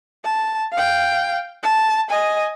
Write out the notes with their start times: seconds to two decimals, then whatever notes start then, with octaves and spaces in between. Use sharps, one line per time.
0.25 A5
0.73 F5 G5
1.63 A5
2.10 D#5 G#5